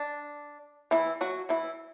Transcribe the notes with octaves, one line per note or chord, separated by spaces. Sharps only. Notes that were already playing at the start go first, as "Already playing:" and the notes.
Already playing: D4
E3 E4
F#3 F#4
E3 E4